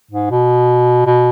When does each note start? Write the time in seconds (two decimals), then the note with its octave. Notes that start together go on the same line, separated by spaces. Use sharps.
0.11 G#2
0.31 B2
1.06 B2